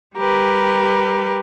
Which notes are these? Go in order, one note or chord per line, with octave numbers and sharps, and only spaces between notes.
G3 G4 A#4 B4